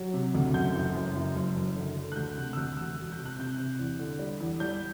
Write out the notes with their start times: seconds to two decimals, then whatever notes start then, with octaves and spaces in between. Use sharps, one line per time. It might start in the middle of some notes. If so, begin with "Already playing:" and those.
Already playing: F#3
0.14 C3
0.35 D2
0.54 F#2 G6
0.75 F#1
0.95 F#2
1.15 F#1
1.35 F#1
1.56 F#2
1.76 D3
1.96 D3
2.12 F#6
2.16 D2 G6
2.37 C3 G6
2.53 E6
2.57 D2 F#6
2.77 E1 E6
2.98 E1
3.12 G6
3.18 C3
3.26 F#6
3.39 C3 G6
3.58 C3
3.79 E2
3.99 D3
4.19 G3
4.40 E2
4.60 G3 G6